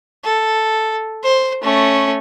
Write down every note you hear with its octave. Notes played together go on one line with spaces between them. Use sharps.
A4
C5
A3 C#4